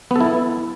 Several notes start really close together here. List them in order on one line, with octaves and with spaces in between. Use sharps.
B3 A4 E4